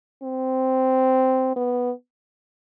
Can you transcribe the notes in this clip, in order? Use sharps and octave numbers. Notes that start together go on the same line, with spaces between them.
C4
B3